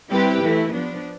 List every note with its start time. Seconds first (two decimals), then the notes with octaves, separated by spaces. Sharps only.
0.11 G3 C4 E4 G4 B4
0.43 E3 A3 E4
0.73 F3 B3 D4